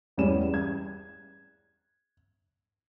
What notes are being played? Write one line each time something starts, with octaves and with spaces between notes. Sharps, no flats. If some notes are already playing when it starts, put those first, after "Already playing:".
E2 G3 C#4 E7
G#6